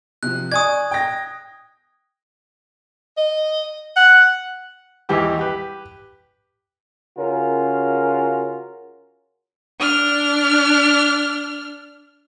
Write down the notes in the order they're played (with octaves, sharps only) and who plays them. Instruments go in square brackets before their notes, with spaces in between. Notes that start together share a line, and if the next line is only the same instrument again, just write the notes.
[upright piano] C3 F3 [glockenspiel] F#6
[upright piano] D5 G#5 C#6 [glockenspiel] D#6 G#6
[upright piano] G5 A#6
[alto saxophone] D#5
F#5
[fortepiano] D#2 E3 G3 G4 D6
G4 B4
[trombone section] C#3 C#4 F4 F#4 A#4
[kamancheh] D4 F6